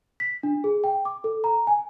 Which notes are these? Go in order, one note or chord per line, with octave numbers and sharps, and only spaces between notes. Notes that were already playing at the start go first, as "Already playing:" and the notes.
B6
D4
G#4
G5
D6
A4
A#5
G#5